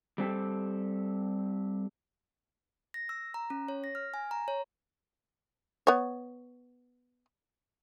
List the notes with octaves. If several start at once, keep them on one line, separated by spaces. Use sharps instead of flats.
G3 C4 G4 A4
A#6
E6
A#5
C#4
C#5
A#6
F6
G#5
A#5
C#5
B3 C#5